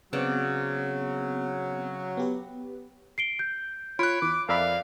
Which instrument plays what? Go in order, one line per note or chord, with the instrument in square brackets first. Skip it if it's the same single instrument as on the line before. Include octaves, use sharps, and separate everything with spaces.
[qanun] C#3 D5 F#5 [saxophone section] F#3 [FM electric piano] B3 C4
[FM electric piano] B3 G4 B4
[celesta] C7 D7 G7
G6
[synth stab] F4 [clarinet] C#5 [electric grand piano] B5 F#6 [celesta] D7
[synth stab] E2 [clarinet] D6
[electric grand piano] F2 D5 [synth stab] A#4 E5 B5 [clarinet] F5